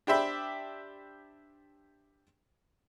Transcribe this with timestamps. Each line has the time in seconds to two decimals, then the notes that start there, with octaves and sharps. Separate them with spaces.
0.07 D4 G4 C5 E5 B5